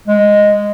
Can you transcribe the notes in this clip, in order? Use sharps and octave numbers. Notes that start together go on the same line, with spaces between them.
G#3